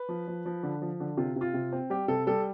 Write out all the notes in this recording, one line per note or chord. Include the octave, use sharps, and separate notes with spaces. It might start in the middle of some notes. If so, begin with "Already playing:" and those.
Already playing: B4
F3
F3
F3
D3
F3
D3
C3 F4
C3 F4
C3
C4
G3 G4
C3 A4
G3 A4